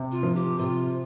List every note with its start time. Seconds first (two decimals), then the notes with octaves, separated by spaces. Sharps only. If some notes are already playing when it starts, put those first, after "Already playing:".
Already playing: C3
0.11 F4
0.23 F3
0.35 G4
0.59 C3 F4